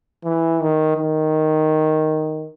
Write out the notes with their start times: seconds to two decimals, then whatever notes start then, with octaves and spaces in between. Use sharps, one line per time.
0.25 E3
0.61 D#3
0.97 D#3